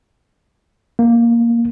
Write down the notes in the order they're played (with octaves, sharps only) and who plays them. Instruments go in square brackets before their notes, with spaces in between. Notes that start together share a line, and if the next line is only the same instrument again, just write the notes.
[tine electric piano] A#3